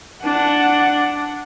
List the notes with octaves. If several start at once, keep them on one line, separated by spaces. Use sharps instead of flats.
D4 F#5